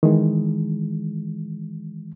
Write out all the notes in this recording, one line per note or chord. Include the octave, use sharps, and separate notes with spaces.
D#3 E3 G#3